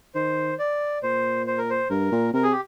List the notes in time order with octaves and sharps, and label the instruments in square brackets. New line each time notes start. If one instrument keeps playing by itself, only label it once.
[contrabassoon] D#3 [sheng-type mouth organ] C5
[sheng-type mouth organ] D5
[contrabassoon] A#2 [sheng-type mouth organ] C5
[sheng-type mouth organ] C5
A#4
C5
[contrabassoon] G2 [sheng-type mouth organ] A#4
[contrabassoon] A#2
[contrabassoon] C3 [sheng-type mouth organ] A#4
[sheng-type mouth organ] G#4
G4